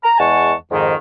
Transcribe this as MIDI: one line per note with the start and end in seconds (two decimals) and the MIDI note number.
0.03 0.17 82
0.18 0.53 40
0.18 0.53 56
0.18 0.53 78
0.18 0.53 80
0.18 0.53 81
0.18 0.53 85
0.71 0.94 41
0.71 0.94 44
0.71 0.94 51